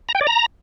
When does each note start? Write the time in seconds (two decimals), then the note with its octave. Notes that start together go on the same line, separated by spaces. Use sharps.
0.09 A#5
0.15 G5
0.21 D5
0.27 A#5